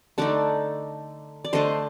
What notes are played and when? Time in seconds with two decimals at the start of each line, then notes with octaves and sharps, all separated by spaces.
0.18 D3 A3 D#4 D5 F#5
1.44 D5
1.53 D3 A3 D4 C5 D#5